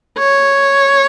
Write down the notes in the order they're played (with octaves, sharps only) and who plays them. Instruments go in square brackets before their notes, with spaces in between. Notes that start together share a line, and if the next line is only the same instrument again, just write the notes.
[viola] C#5